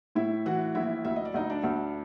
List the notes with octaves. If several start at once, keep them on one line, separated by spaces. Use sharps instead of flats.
A2 E4 E5
E3 F#4 F#5
A#1 E4 E5
D2 E5
D#5
D5
D2 D#4 D#5
D4 D5
D2